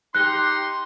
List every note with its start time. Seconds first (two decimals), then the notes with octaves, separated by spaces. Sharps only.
0.15 D#4 G4 C6 F#6